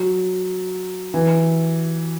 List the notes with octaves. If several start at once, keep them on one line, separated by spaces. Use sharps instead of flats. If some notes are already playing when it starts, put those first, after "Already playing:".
Already playing: F#3
E3